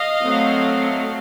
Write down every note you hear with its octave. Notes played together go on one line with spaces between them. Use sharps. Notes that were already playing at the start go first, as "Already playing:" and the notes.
Already playing: D#5 F5
F#3 A3 C4